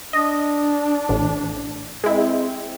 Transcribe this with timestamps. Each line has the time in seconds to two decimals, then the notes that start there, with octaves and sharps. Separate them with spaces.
0.13 D4 D#5
1.09 A1 A2
2.04 G#3 C4 E4